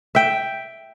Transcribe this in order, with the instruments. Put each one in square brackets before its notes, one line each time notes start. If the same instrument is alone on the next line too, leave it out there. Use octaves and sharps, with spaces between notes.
[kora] E5 G5